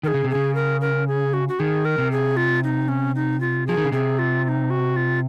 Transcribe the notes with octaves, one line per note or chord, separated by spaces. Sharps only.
D#3 G#4 A#4
C#3
C3
C#3 G#4
A#4
A#4
G#4
F#4
F#4
D#3 G#4
A#4
C3
G#4
F4
D#4
C#4
D#4
F4
F3 G#4
D#3
C#3
C3 G#4
F4
F4
D#4
F#4
F4